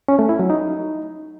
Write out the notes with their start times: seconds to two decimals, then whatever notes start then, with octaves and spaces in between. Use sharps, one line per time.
0.08 C#4
0.19 A3
0.29 E4
0.39 F#3
0.50 D#4